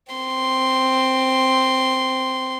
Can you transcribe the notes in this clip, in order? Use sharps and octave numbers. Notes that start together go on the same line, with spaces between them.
C4 C6